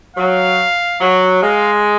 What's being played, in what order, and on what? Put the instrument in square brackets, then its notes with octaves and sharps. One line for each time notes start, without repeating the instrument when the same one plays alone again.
[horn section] F#3 [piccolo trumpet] F5
[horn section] F#3
[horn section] G#3 [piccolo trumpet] F5